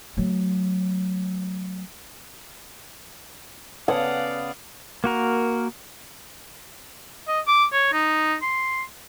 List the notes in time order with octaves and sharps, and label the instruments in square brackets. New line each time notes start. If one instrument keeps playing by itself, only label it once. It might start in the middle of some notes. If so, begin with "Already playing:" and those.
[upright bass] F#3 A3
[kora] C#3 G#4 A4 [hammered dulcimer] B3 [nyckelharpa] D5 F5 [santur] F#5
[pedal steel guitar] A#3 F#4 A#4
[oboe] D#5
D6
C#5
D#4
C6